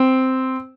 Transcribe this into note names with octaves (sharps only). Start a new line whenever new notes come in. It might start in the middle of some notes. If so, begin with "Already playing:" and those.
Already playing: C4